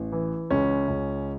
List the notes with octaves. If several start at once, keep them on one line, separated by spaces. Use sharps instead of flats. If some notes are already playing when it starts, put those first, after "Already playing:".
Already playing: A1
E3
C#2 C#4
C#2